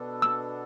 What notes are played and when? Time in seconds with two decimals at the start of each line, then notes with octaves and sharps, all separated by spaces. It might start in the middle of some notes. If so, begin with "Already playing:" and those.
Already playing: B2 B3 D4 A4
0.22 E6